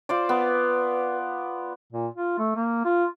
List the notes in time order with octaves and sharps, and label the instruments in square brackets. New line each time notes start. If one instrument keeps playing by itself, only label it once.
[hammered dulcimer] F4 C5 D5
[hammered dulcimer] B3 [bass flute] B4
[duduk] A#2
F4
A3
A#3
F4